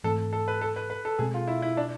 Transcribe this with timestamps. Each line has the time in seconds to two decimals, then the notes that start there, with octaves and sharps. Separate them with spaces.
0.04 G#2 E3 A3 C4 A4
0.33 A4
0.48 B4
0.61 A4
0.76 B4
0.90 B4
1.05 A4
1.19 B2 G#3 C4 G#4
1.34 F4
1.48 E4
1.62 E4
1.77 D4